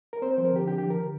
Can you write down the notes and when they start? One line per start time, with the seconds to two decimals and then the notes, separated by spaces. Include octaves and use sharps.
0.13 A#4
0.22 C4 C5
0.34 F3 C5
0.45 A#4
0.52 D3 G4
0.67 D4 G4
0.78 F3 G4
0.90 A#4
0.98 D3